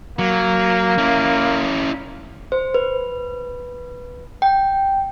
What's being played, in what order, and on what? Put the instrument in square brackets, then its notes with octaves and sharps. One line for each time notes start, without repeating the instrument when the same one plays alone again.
[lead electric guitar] F#3 [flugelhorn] A#3
[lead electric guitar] C#4 E4
[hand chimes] C5
B4
G5